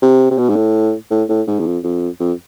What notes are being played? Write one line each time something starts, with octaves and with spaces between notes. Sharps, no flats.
C3
C3
B2
G#2
A2
A2
A2
G#2
E2
F2
F2
F2